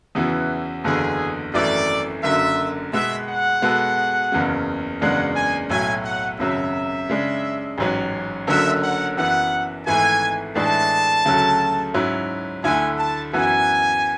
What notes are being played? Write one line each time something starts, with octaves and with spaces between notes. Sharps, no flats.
E2 C#3 E3 B3 F#4
F#1 E2 D3 G#4
G#1 F#2 E3 A3 D5
F#1 F#2 D3 E5
B2 G#3 B3 E5
F#5
B2 G#3 B3 F#4 A4
F#1 E2 C#3
F#1 E2 C#3 G#3 D4 F#5
G#5
B1 A2 F#3 G#5
F#5
G#1 F#2 C#3 F#3 E5
C#3 G#3 D4
A1 G#2 F#3 C#4
F#1 F#2 D3 F#3 C#4 E5
F#5
F#2 E3 B3 F#5
G#1 G#2 E3 A3 G#5
A2 E3 G#3 D4 G#4 A5
D2 C#3 F#3 A3
G#2 F#3 C#4 E4
D2 D3 A3 E4 G#5
A5
F#2 E3 B3 F#4 G#5